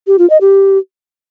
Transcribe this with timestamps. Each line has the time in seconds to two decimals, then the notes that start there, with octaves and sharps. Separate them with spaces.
0.07 G4
0.19 F4
0.30 D#5
0.41 G4